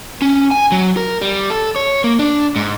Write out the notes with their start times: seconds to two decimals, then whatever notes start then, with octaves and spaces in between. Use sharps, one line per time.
0.22 C#4
0.51 G#5
0.72 F#3
0.97 A#4
1.21 G3
1.50 A4
1.76 C#5
2.04 A#3
2.19 D4
2.56 G#2